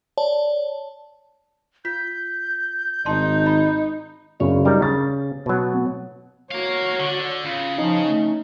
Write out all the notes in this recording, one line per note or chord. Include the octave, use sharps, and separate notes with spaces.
C#5 D5 A5
F4 G6 B6
G#1 D#4 A5 C6
D#5 B5
F#2 C#3 D4 E4 C#5
G3 D#4 A#4
C#3 A6
B2 F#3
B3
F#4 A#4 C#5 F5
D3
C#3 F4
F3 C#4 D#4
A3